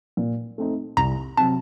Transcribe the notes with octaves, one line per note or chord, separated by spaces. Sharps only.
A#2
A3 C4 D#4
C2 A#5
C3 F#3 C4 A5